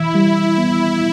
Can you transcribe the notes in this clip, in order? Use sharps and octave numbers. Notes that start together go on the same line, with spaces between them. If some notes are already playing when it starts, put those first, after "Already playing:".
Already playing: E3 E4
G3
B3 E4